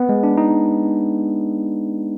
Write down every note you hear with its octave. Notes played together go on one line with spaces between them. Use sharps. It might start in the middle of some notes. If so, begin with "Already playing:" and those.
Already playing: B3
G#3
D4
D#4